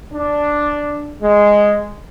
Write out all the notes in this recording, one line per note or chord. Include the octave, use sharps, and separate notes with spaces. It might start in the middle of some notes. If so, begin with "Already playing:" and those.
D4
G#3